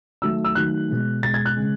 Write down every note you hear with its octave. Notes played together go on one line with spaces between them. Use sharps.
D#3 F#3 A3 E6
E6
D#3 F#3 A3 F#6
B2 G#3
B2 G#3 A6
G#6
F#6
C#3 G#3